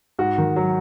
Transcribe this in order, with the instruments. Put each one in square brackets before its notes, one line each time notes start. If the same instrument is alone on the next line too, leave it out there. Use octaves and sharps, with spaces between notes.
[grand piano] G#2 F#4
D#3
F#3